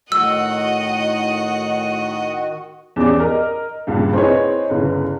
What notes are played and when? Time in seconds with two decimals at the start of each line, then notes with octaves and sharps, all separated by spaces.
0.12 A2 D#3 F#4 D#5 F#5 E6
2.96 E2 C#4 G4 D5 D6
3.20 A#4 D#5
3.87 C#2 G2 A#2
4.13 C4 D#4 E4 G#4 B4 C#5
4.70 G1 C#3 E4 B4